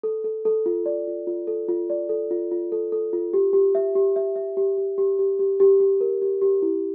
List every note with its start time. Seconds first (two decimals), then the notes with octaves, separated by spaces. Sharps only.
0.03 A4
0.24 A4
0.45 A4
0.66 F4
0.86 D5
1.07 F4
1.27 F4
1.47 A4
1.69 F4
1.90 D5
2.09 A4
2.31 F4
2.51 F4
2.72 A4
2.92 A4
3.13 F4
3.33 G4
3.53 G4
3.75 E5
3.95 G4
4.16 E5
4.36 E5
4.57 G4
4.78 G4
4.98 G4
5.19 G4
5.39 G4
5.60 G4
5.80 G4
6.01 A#4
6.22 G4
6.41 G4
6.62 E4